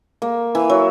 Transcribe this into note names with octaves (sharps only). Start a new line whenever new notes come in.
A#3
E3
F#3